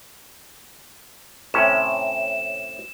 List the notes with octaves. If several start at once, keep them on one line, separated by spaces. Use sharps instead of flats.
A2 C3 C#4 E7